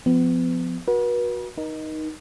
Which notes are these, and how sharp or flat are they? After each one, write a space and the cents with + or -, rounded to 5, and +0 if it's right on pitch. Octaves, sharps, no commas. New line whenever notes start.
F3 +0 B3 +35
F#4 -10 B4 -40
D#4 +0 A#4 +35